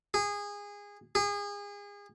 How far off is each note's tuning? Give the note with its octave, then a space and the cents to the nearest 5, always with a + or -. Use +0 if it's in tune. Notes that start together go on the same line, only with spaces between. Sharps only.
G#4 -20
G#4 -30